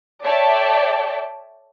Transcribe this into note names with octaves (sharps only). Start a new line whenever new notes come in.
A4 C#5 D5 E5 G5 A5